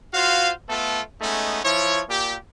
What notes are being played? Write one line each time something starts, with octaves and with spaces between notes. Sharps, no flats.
F4 F#4 C5 F5
A3 B3 F4 A4
G#3 A3 B3 C#4 D#4
F3 E4 C#5
A#2 G4